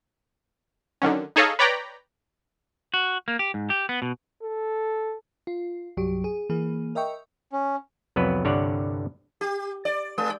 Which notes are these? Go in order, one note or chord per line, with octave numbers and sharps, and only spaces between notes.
D3 D#3 F#3 C#4
D#4 G#4 A4 C#5 D#5 F5
B4 C#5 D5 G5 A#5 B5
F#4
A#3
G4
G#2
G4
B3
B2
A4
F4
C2 G2 F#3 G4
G#4
E3 A#3 G#4
A#4 D#5 E5 G5 C#6
C#4
C2 F2 F#3 B3 B4
C2 G2 D3 C#5 D5 F#5
G4
D5
G#3